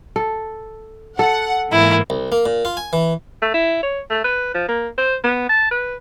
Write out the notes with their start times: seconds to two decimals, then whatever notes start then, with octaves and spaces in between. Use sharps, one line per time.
0.16 A4
1.19 A4 F#5
1.72 G#2 E3 A#3 E4
2.10 C2
2.32 A#3
2.46 A#2
2.65 F4
2.77 G#5
2.93 E3
3.42 A3
3.54 E4
3.83 C#5
4.10 A3
4.24 B4
4.54 F3
4.68 A#3
4.98 C5
5.24 B3
5.49 A5
5.71 B4